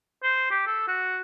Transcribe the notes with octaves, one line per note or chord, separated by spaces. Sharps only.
C5
G4
A4
F#4